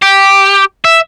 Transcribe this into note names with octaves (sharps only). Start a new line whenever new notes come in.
G4
E5